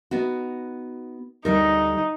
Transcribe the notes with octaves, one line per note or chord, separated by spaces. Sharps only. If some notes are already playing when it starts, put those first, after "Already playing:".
B3 D#4 F#4
D2 G3 D#4 A#4